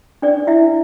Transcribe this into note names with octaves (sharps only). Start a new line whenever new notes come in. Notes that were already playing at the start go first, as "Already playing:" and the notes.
D4 D5
E4 E5